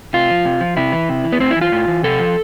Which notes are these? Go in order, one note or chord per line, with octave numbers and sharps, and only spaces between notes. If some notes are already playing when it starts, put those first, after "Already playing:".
C3 F4
F3
C3
F3
C3 E4
E3
C3
E3
B3
A2 C4
E4
E3
F4
A2
E3
C3 A4
F3